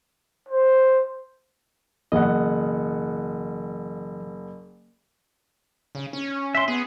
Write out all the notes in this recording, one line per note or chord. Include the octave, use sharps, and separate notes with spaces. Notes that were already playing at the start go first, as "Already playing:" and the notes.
C5
F#1 B2 E3 D#5 F#5
C#3
C#4
E5 C6
B3 G#4